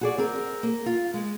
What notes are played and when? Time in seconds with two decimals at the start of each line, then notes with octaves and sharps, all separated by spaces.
0.01 F#4 G#4 D5
0.18 C4 G#4 A#4
0.63 A#3
0.86 F4
1.14 G#3